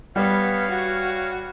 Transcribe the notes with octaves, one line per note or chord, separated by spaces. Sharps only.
G3 B3 C#5 F5 F6
F#4